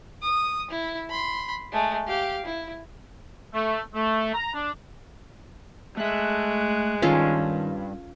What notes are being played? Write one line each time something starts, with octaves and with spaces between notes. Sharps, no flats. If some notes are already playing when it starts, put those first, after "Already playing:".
D#6
E4
B5 C6
G#3 A3
G4 F5
E4
A3
A3
A#5
D4
G#3 A3 E5 F#6
G2 D#3 C#4 F4 A4